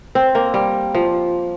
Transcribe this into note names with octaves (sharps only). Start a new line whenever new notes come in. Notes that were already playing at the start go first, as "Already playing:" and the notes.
C4
A#3
G3
F3